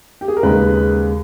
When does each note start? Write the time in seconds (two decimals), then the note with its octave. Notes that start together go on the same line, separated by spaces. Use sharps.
0.21 G4
0.28 G#4
0.37 A#4
0.43 D#2 C#3 G#3 B4